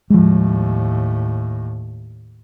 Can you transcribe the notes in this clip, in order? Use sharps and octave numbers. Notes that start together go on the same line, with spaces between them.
D#2 A2 F3 G#3